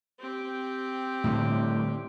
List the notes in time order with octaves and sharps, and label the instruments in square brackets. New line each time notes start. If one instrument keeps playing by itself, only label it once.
[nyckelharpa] C4 G4
[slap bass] A2 D3 G3